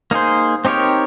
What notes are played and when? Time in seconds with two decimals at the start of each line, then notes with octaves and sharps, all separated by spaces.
0.11 A#3 D#4 G#4 C5
0.65 C4 D#4 G4 A#4 C#5